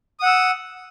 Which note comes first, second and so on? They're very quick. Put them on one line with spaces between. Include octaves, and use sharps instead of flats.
D#6 F#5 E6